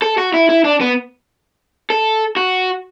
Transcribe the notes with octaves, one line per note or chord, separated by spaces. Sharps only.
A4
F#4
E4
E4
D4
B3
A4
F#4